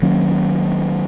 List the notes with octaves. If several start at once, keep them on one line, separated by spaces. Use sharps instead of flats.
D#3 F#3 A#3 C#4